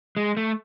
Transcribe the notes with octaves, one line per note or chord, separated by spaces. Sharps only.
G#3
A3